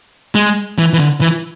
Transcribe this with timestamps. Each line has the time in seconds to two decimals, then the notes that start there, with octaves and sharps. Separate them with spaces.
0.35 G#3
0.79 E3
0.93 E3
0.99 D3
1.21 E3